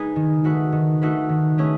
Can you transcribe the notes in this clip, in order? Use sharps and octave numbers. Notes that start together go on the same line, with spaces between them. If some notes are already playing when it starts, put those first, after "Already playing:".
Already playing: G#3 D#4 G#4 B4
D#3
A3 D#4 F#4 B4
D#3
A3 D#4 F#4 B4
D#3
A3 C#4 G#4 B4